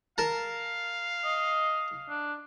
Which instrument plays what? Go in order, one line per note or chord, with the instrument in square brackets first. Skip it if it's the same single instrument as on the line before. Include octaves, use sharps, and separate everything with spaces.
[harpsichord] A#4 A5 [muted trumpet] F5
[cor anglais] D#5
D4